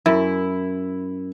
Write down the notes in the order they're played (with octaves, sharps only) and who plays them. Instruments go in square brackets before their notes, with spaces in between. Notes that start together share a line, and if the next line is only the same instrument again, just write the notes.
[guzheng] F#2 [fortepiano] E4